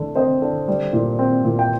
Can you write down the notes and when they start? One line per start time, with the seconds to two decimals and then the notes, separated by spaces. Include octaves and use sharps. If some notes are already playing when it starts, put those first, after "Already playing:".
Already playing: D3 A3
0.15 C4 C5 D#5
0.42 D3
0.68 G3
0.93 A#2
1.19 C4
1.45 A#2
1.59 G5